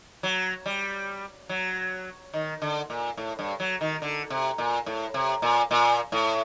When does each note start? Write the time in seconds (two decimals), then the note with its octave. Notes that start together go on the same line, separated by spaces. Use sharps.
0.23 F#3
0.66 G3
1.49 F#3
2.34 D#3
2.62 D3
2.90 A#2
3.17 A2
3.39 G2
3.60 F#3
3.81 D#3
4.02 D3
4.30 C3
4.58 A#2
4.86 A2
5.14 C3
5.42 A#2
5.71 A#2
6.12 A2